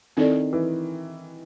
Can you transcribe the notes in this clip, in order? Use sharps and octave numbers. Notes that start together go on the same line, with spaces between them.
D#3 C4 E4 A4 D5
E3